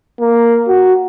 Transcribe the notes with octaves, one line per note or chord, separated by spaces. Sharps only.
A#3
F#4